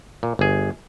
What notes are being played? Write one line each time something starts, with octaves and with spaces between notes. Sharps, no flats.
A#2
G1 G#4